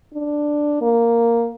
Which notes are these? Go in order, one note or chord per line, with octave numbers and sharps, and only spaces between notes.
D4
A#3